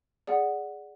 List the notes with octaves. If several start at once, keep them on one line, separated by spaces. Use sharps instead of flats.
G#4 D5 F#5